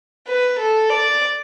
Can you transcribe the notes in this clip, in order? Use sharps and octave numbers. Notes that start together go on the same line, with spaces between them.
B4
A4
D5